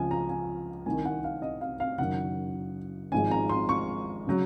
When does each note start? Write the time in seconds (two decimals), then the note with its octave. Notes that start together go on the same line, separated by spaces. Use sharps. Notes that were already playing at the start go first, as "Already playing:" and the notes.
Already playing: C#2 C#3 F3 G#5
0.11 A#5
0.29 G#5
0.86 C2 C3 D#3 G#5
1.05 F#5
1.24 F5
1.42 D#5
1.61 F5
1.80 F5
1.98 F#1 F#2 D#3 F#3 F#5
3.12 G#1 G#2 F3 G#3 G#5
3.31 A#5
3.49 C6
3.69 C#6
4.27 C#3 F#3